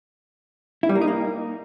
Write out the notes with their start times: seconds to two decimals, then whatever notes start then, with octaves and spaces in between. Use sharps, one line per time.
0.83 E4
0.89 G3
0.95 A#3
1.01 D#4
1.08 A#3